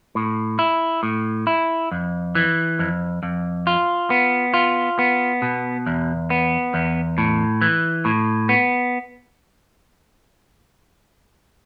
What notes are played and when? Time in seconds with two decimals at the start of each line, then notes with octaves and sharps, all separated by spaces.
0.15 A2
0.59 E4
1.03 A2
1.47 E4
1.92 F2
2.35 E3
2.79 F2
3.23 F2
3.67 F4
4.10 B3
4.54 F4
4.99 B3
5.42 B2
5.86 E2
6.30 B3
6.74 E2
7.18 A2
7.61 E3
8.05 A2
8.49 B3